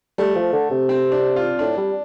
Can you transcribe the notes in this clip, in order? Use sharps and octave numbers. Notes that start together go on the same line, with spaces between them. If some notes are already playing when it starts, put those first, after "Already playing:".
G3 A3
F3
D3
C3
C4
D4
F4
A2 D4
G3